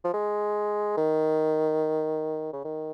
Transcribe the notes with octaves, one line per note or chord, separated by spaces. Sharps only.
F3
G#3
D#3
C#3
D#3